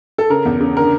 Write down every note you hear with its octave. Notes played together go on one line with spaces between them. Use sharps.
A4
C#3 A#4
E2
C#3
D3 A#4